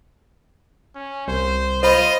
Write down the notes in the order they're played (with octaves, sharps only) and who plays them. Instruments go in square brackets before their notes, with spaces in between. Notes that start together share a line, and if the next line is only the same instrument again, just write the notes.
[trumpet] C#4
[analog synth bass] C2 [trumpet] C5
[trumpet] F4 [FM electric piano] C5 B5 [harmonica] D#5